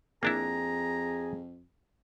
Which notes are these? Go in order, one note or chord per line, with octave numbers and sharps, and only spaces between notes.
F2 A#3 D4 E4 G#4 A#5